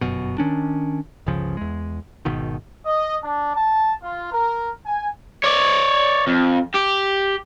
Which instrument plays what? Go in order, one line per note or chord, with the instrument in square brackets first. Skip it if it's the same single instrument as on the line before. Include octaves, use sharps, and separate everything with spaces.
[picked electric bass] G1 F#2 B2
D#3 C#4 D4
G1 C#2 C#3 F3
E2 G#3
G#1 B2 D#3
[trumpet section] D#5
D4
A5
F4
A#4
G#5
[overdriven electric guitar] C#5 D5
F2
G4